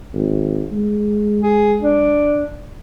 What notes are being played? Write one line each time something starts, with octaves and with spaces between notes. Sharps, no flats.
G#1
G#3
G#4
D4